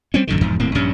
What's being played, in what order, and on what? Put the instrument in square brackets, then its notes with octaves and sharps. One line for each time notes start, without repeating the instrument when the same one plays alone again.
[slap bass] G3 C4 C#4
A1 F#2 D3 D#3
E1 E2 G#2 F3
D#1 A2 A#3 C4
A#1 G2 G3 C#4